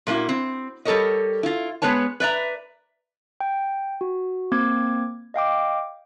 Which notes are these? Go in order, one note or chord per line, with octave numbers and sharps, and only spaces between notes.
A#2 A3 A#3 E4 F#4
C4
G3 G4 A4 A#4 C#5 D#5
E4 F4
G#3 B3 B4 C#5 A5
B4 D5 E5 A#5
G5
F#4
A#3 C4 D6 G#6
D#5 F5 G5 D6